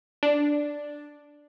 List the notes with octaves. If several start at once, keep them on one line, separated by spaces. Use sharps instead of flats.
D4